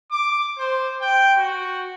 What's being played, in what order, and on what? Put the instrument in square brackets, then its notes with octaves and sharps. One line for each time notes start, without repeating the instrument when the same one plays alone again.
[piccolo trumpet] D6
C5
G5
F#4